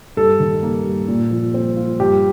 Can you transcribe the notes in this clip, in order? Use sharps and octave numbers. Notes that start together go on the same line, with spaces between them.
G2 A4
D#3
A#3
G2
A#2
F3
C4
F4
G2 G4